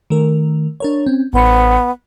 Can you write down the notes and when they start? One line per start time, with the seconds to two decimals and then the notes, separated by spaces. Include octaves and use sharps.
0.10 D#3 A3 A#4
0.80 D4 A#4 C#5
1.06 C4 C#4
1.33 A1 B3 C5 C#7